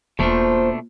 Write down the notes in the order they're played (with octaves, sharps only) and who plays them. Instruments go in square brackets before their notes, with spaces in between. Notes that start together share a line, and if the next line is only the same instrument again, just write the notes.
[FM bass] E1 [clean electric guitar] B2 A3 D4 [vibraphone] A#3 F4 [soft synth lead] C5